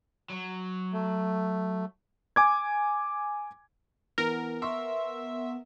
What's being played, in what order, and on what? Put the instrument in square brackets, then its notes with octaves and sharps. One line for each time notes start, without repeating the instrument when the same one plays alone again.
[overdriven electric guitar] F#3
[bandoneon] A3
[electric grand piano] G#5 D6 G#6
[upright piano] E3 [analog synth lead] B3 [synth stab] A#4
[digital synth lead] E5 [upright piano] C6 C#6 E6